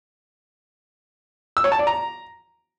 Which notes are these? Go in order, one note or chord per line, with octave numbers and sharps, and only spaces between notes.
E6
C#5
A5
D5
A#5